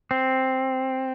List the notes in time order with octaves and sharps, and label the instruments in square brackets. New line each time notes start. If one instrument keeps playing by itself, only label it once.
[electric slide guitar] C4